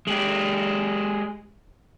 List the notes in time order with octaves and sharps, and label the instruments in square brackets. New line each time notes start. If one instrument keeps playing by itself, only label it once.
[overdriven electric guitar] G#3 G4